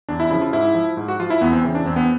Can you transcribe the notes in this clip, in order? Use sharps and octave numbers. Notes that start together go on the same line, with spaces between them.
E2 D4
E4
C#3 F3 E4
F4
G#2 E4
F3
G#2
F#4
F3 F4
E4
E2 B3
C4
C#3 E3
D4
E2 C4
B3